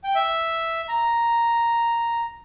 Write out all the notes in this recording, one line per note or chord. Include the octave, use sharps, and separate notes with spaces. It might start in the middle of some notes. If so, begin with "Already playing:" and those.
G5
E5
A#5